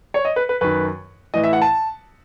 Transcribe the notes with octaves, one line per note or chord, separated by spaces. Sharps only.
C#5
D#5
B4
B4
F#2 D#3 B4
A2 E3 D#5
E5
F#5
A5